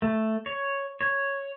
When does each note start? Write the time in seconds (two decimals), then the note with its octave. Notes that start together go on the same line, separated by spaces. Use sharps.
0.02 A3
0.46 C#5
1.01 C#5